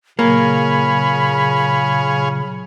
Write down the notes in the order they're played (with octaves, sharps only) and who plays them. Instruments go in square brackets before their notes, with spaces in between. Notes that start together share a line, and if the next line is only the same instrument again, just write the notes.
[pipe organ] A#2 C#3 F#3 [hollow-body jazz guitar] A#3 [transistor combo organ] G#4 C#5 F5 [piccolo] B5